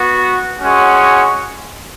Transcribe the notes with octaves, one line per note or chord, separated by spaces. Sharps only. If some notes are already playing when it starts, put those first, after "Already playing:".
Already playing: B3 F#4
G#3 C#4 F#4